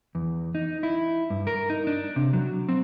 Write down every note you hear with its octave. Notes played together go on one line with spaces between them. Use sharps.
E2
D#4
E4
G2
A#4
D#4
D4
C3
F#3
C4